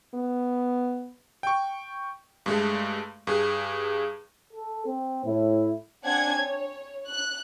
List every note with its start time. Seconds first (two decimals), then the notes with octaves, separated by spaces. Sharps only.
0.14 B3
1.43 G5 C#6
2.46 G2 G#3 A3
3.27 G2 G#4
4.53 A4
4.86 C4
5.26 A2 E4
6.02 C4 D4 F#5 G#5 G#6
6.36 C#5
7.08 F#6